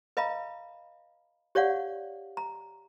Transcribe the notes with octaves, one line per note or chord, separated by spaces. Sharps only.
B4 D#5 F5 A#5 B5
G4 C#5 D5 F5 F#5
A#5